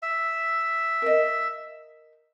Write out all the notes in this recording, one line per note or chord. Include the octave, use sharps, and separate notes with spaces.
E5
A#4 D#5